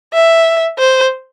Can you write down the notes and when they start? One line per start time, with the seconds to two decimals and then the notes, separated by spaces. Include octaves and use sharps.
0.13 E5
0.79 C5